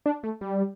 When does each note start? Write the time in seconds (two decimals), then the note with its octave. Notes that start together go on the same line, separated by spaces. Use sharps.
0.06 D4
0.23 A3
0.41 G3